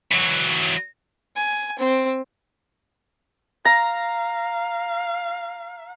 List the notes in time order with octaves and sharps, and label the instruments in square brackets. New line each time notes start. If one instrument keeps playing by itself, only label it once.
[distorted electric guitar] E3 F#3
[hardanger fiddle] G#5
C4
[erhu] F5 [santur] A#5